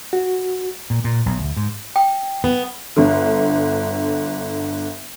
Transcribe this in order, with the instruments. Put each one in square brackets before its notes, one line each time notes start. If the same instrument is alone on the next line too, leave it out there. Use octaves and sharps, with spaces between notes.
[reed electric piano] F#4
[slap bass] A#2
A#2
B1
D2
G#2
[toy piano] G5
[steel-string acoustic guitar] B3
[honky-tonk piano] G1 D3